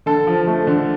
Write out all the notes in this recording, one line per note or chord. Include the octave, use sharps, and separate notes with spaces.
D3 A4
F3
A3
D3